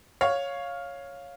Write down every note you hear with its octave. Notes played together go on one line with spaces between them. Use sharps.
C#5 F5